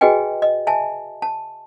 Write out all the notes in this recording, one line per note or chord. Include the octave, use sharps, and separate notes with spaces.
F#4 G#4 B4 D#5 G5 G#5
D#5
E5 G#5 A5
A5